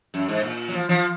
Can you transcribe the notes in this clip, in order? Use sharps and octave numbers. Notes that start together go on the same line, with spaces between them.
F#2
G#2
A#2
F#3
F3
F3